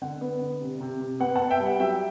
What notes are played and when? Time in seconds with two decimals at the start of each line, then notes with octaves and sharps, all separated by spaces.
0.02 D3 F#5
0.21 B3
0.41 D3
0.62 C3
0.81 C3
1.01 C3
1.20 B3 F#5
1.36 F#5 A5
1.41 B3
1.50 E5 G5
1.60 G3
1.66 F#5
1.80 F#3 E5 G5